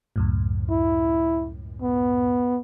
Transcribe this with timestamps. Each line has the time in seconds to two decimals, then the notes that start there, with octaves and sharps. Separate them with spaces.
0.16 C#2 F#2 A2
0.71 E4
1.82 B3